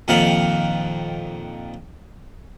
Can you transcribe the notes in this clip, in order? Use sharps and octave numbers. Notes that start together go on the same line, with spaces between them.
F2 A#2 D#3 F5 F#5